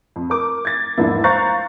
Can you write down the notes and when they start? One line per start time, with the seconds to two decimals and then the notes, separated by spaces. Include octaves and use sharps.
0.16 F2
0.30 A#4 D6
0.65 G#6 A6
0.97 E2 G#2 F3 A#3 D4 E4
1.24 C5 F5 A#5 C#6 F#6 A6